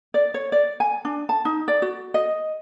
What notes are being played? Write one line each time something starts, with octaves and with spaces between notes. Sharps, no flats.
D5
C#5
D5
G#5
D4
A5
D#4
D5
F#4
D#5